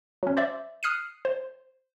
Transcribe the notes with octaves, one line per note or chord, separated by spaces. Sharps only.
F#3 C#4
C5 D5 E5
D#6 F6 F#6 C7 C#7 D#7
C5